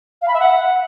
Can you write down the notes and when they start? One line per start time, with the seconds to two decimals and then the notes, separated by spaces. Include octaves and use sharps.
0.22 F5
0.28 B5
0.34 E5
0.40 F#5